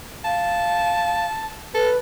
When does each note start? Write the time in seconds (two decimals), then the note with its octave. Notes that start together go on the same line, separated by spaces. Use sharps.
0.25 F5 A5
1.75 A4 B4